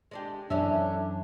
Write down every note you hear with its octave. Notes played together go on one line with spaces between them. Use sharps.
G#3 D4 G4
F#2 A2 E3 C#4 D4 E5